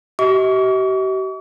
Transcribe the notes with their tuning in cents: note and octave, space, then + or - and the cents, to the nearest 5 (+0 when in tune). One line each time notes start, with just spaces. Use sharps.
G4 -45 D#5 +45 C#6 +45